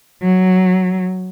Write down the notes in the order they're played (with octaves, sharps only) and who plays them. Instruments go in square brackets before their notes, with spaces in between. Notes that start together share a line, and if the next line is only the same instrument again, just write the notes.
[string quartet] F#3